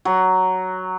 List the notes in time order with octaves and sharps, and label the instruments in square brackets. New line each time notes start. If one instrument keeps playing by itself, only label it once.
[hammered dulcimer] F#3